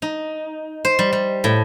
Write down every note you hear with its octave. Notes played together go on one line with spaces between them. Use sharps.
D#4
C5
G3
G3
A2